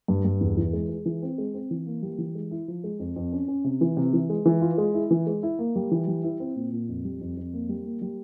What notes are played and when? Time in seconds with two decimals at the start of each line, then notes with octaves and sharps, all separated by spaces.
0.08 G2
0.25 G2
0.41 E2
0.57 E3
0.73 G#3
0.89 G#3
1.05 E3
1.22 C4
1.38 G#3
1.54 C4
1.71 E3
1.86 A#3
2.02 G3
2.18 E3
2.35 G#3
2.51 E4
2.68 F3
2.84 G#3
2.99 F2
3.16 F2
3.32 C#4
3.48 C#4
3.64 C3
3.81 E3
3.97 C3
4.13 E3
4.29 G#3
4.45 E3
4.61 F4
4.78 G#3
4.94 E4
5.11 E3
5.27 G#3
5.43 E4
5.59 A#3
5.76 G3
5.91 E3
6.07 G3
6.24 E4
6.40 C4
6.56 A#2
6.72 A#2
6.88 F2
7.05 G3
7.21 F2
7.37 F2
7.53 A#3
7.69 G3
7.86 A#3
8.02 G3